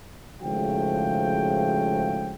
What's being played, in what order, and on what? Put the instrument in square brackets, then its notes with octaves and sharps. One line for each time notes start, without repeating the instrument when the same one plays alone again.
[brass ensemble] G#1 A2 C#3 F3 F#4 G5